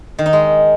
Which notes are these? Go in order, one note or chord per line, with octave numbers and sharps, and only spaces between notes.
D#3
D#4
G#3